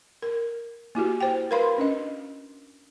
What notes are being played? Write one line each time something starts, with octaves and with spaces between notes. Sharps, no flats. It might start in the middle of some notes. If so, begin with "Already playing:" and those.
A#4
A#3 E4 F#4 G4
C5 G5
A#4 B4 F5 B5 C6
C#4 D4 D#5